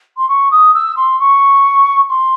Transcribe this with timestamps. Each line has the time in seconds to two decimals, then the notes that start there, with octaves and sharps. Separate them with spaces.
0.17 C6
0.28 C#6
0.51 D#6
0.74 E6
0.96 C6
1.19 C#6
2.09 C6